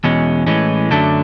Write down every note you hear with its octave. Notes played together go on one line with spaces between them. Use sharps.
E2 B2 G#3 C#4
A2 E3 G#3 C#4
F#2 D3 F#3 A3 D4